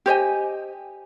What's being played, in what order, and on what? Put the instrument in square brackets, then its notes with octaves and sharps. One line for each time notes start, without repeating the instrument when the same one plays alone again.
[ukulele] G4 C5 D#5 G#5